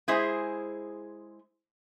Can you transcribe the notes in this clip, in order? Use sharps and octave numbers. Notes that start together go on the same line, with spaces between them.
G#3 E4 G#4 C5